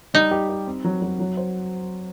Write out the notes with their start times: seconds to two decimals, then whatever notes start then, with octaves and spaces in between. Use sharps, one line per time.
0.14 G3 D#4
0.31 G4
0.49 G4
0.67 C4
0.85 F#3
1.02 F#3
1.19 F#3
1.37 C5